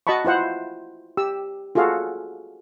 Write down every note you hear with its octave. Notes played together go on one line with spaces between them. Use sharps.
F#4 D#5 A5 B5 C#6
E4 F4 C5 F#5
G4 E6
F4 F#4 G#4 A4 F5